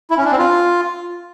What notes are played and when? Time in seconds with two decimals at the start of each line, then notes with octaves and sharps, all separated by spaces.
0.10 E4
0.18 C#4
0.25 D4
0.32 C4
0.39 F4